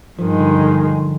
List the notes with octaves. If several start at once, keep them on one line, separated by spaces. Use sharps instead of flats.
G2 D#3 F3 G#3
D3
D3